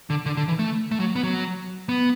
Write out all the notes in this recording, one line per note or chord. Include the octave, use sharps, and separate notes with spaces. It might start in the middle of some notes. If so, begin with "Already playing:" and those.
D3
D3
D3
E3
A3
A3
F#3
B3
F#3
B3